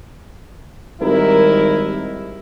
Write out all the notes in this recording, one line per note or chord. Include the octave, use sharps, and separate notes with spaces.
G#1 G3 D#4 E4 A#4